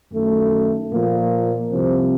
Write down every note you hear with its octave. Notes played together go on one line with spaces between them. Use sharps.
F#2 D#3 A3
A#2 F3 A#3
C2 C3 F3 C4